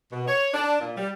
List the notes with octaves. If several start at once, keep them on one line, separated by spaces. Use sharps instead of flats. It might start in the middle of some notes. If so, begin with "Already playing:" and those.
B2
C#5
D4
A#2
G3